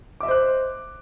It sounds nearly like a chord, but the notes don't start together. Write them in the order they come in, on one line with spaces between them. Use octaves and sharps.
D6 E5 D#5 C5 F#6